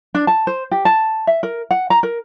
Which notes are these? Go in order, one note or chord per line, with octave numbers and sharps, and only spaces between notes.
D4
A5
C5
G4
A5
E5
A#4
F#5
A#5
A#4